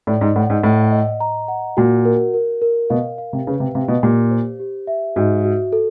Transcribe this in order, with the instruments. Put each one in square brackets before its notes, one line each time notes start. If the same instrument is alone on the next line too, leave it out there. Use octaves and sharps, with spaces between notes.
[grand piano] A2 [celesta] D5
[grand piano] G#2
[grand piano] A2 [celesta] F#5
[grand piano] G#2
[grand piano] A2 [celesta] D#5
[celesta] D#5
A#5
F#5
[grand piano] A#2 [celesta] F#4
[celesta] A#4
A#4
A#4
[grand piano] B2 [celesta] F5
[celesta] F5
[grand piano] C3
[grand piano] C#3 [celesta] B4
[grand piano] C3
[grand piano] C3 [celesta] F5
[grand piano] B2
[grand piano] A#2 [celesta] G4
[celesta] C5
G4
E5
[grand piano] G#2 [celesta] F#4
[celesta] F#4
A4